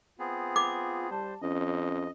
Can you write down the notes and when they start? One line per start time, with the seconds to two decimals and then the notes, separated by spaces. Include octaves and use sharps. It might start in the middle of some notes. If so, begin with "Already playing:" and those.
0.19 B3 C4 F4 G#4
0.56 D6
1.11 G3 C5 A5
1.42 F2 C#4 D#5